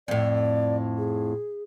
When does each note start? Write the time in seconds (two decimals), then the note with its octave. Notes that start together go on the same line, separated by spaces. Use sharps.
0.08 F2 A2 D5
0.98 G#4